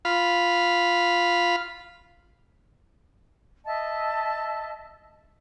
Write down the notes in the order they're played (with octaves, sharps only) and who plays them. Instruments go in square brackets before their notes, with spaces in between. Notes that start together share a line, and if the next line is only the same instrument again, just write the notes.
[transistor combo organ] F4 F5 B5
[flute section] D#5 E5 A5